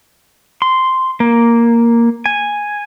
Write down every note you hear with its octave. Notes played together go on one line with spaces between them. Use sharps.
C6
A#3
G#5